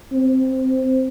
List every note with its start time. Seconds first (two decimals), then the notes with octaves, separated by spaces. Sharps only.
0.12 C4